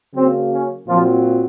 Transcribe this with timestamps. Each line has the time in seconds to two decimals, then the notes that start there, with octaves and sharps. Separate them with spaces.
0.14 C#3 F#3 A#3 C4
0.51 C#4
0.87 A#2 F3 F#3 C4 F4